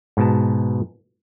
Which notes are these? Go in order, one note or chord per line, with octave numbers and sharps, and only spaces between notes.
G#2 B2 A5